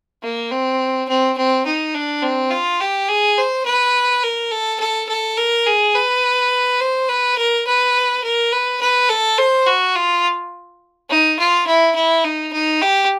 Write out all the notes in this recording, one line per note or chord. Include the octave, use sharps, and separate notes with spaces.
A#3
C4
C4
C4
D#4
D4
C4
F4
G4
G#4
C5
B4
A#4
A4
A4
A4
A#4
G#4
B4
C5
B4
A#4
B4
A#4
B4
B4
A4
C5
F#4
F4
D#4
F4
E4
E4
D#4
D#4
G4